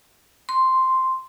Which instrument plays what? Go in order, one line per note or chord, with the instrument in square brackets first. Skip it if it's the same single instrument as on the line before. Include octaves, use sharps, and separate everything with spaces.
[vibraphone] C6